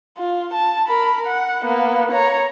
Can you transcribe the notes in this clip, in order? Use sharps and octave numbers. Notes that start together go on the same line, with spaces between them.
F4
A5
A#4 B5
F#5
A#3 B3
C#5 A#5